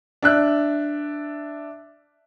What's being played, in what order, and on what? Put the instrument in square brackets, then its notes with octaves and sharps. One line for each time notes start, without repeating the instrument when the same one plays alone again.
[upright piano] D4 E5 F#6